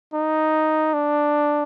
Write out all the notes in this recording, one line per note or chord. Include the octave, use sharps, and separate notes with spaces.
D#4
D4